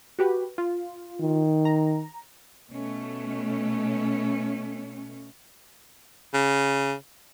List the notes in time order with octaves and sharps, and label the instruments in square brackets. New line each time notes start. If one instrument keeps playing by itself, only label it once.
[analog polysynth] F#4 G4 B4
F4
[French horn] D#3
[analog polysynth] A#5
[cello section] B2 A3 C#4
[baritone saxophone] C#3